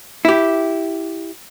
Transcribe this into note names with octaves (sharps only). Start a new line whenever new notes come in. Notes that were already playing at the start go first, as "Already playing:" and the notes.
E4 G4